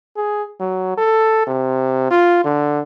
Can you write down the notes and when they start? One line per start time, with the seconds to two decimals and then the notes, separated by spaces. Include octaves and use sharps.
0.16 G#4
0.60 F#3
0.98 A4
1.47 C3
2.11 F4
2.45 D3